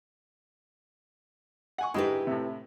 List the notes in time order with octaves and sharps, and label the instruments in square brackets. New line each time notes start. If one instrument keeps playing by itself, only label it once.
[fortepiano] F#5 G#5 C#6
[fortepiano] G#2 D3 G#3 [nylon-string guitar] E4 G4 B4
[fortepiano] A2 C3